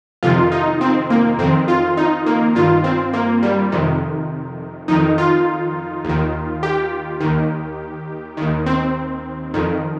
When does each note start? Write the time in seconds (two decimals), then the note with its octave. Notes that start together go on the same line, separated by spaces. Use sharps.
0.23 F2 C3 D#3 F4
0.52 D#4
0.81 C4
1.10 A#3
1.39 F2 D#3 C4
1.68 F4
1.97 D#4
2.26 A#3
2.55 G2 D#3 F4
2.84 C4
3.13 A#3
3.43 G3
3.72 F2 C3 D#3
4.88 F2 D#3 D#4
5.18 F4
6.05 D#2 D#3
6.63 G4
7.21 D#2 D#3
8.37 D#2 D#3
8.66 C4
9.54 F2 D#3